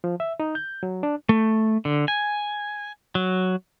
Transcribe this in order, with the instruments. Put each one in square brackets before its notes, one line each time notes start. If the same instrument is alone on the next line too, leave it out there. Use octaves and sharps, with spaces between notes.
[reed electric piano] F3
E5
D#4
G6
F#3
D4
[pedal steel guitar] A3
D3
G#5
F#3